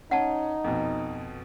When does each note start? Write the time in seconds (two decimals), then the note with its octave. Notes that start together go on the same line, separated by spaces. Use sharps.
0.11 C#4 D#4 F#5 A5
0.64 F2 B2